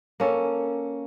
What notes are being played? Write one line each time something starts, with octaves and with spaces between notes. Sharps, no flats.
A#3 C#4 A4